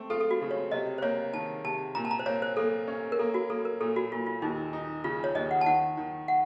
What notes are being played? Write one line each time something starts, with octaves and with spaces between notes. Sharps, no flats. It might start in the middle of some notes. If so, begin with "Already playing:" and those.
Already playing: A3 C4
F4 A4
A4
F#4
C#3
C#5
C3 D#5
C5
A#3 C#5
D#3 A5
C3 A5
A#2 A#5
A5
A#5
C5
A#3 C#5
C5
A#3 A4
C#4
A#4
A#3 A4
F#4
A#3 A4
A#4
A#2 A4
F#4
A#2 F4
F4
D#2 D#4
D#4
C#3 F4
C#5
D#2 D#5
F#5
A5
D#3 F#5
D#3
F#5